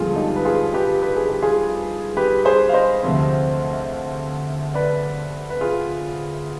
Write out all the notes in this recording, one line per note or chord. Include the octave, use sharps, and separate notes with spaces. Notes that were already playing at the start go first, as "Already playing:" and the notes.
Already playing: G2 D3 F3 G#3 B3 F4 G#4
D#4 G4
B4
F4 G#4
G4 B4
B4
G#4
G4
F4 G#4
G4 B4
G#4 C5
F5
C5 D#5
D2 C3 F3 C4
B4 D5
B4
F4 G#4